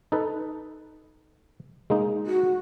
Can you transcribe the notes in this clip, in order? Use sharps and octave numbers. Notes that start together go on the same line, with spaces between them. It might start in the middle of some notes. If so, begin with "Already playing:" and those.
D#4 A4 B4
G#3 A#3 D#4
F#4